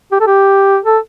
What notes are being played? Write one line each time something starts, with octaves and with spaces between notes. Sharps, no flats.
G4
A4
G4
A4